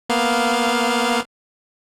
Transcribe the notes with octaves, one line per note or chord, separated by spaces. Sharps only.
A#3 B3 F5